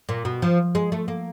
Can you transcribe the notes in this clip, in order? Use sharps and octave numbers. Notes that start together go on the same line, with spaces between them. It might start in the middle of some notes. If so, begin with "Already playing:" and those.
A#2
B2
F3
G#3
A3
A#3